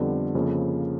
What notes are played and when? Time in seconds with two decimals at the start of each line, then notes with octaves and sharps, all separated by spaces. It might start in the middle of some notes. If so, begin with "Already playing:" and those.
Already playing: F2 D3 G3 B3
0.35 F2 C#3 F3 A#3